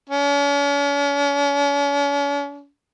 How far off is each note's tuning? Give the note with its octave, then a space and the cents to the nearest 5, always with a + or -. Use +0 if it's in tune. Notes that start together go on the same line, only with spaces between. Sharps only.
C#4 +45